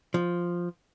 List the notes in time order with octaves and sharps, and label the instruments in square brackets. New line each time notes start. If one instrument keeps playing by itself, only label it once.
[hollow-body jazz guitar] F3